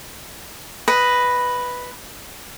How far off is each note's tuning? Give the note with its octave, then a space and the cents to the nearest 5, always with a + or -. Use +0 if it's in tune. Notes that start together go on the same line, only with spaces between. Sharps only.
B4 +0 D#5 +0